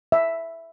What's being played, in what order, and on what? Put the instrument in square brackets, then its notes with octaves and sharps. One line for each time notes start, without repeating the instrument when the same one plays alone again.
[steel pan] E5